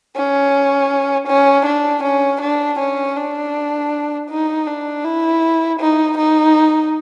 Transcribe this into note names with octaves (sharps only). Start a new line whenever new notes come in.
C#4
C#4
D4
C#4
D4
C#4
D4
D#4
D4
E4
D#4
D#4